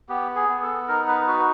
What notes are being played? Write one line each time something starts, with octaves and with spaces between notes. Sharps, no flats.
B3 G4
G#4
B3
A4
D#4 A#4
B4
F#4 B4